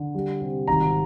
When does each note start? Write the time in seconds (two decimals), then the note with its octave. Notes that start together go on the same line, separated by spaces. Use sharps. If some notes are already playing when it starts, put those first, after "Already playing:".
Already playing: D3
0.14 G3
0.41 C3
0.68 G#1 A#5